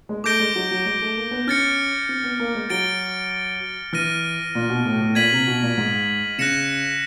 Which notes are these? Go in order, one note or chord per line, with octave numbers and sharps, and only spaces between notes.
G#3
A3 D6 G6 A#6 D7 G7
G#3
F#3
F#3
G#3
A3
A#3
B3
C#4 F6 A6 C#7
C4
B3
A#3
G#3
F#3 A6 D7 G7
E3 F6 A#6 D#7
A#2
B2
A2
A2
A#2 G#6 B6 D#7 F#7
C3
B2
A#2
G#2
C#3 F#6 A#6 C#7 E7